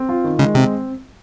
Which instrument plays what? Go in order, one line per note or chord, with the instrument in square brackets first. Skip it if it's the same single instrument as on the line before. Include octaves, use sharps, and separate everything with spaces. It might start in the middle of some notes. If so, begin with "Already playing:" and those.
Already playing: [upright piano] C4
F4
D#3
[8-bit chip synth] C#3 [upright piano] G#3
[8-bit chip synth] C3 [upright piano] C4